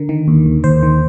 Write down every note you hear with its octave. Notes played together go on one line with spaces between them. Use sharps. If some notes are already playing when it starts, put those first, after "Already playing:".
Already playing: D3 A#4
D#3
D#2
D#2
D#2 C5
D#3